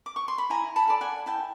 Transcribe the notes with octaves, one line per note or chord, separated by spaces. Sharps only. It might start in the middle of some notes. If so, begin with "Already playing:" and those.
D6
C#6
C6
B5
E4 G#5 A#5
A5 B5
A4 D5
F#5 G#5
E4 G5 A5